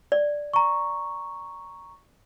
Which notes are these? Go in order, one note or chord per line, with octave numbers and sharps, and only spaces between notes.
D5
A#5 C#6